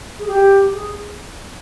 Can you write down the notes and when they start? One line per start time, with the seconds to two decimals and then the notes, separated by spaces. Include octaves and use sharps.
0.19 G#4
0.28 G4
0.73 G#4